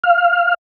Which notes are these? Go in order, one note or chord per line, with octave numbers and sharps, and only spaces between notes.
F5